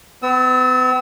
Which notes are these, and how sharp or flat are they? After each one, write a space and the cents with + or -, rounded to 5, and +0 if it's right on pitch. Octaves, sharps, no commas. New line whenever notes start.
B3 +40 E6 -35